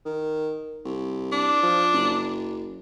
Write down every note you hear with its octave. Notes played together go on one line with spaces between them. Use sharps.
D#3
C2
D4
F3
F#1